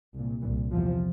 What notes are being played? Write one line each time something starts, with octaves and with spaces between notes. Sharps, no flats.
C2 A#2
C2 A#2 E3
E2 C3 F3